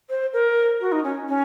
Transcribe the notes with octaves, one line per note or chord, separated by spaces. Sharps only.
C5
A#4
F#4
D#4
C#4
C#4